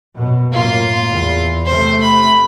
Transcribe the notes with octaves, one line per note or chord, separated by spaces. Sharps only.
F#2 B2
F#2 A2 A#3 F4
E2
C3 A3 C5
B5